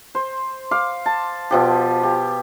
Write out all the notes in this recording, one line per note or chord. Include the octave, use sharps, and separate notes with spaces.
C5
F5 D6
A5
B2 F3 G4
G4